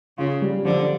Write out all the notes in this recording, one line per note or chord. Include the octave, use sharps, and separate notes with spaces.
C#3 F4
G3
D3 F3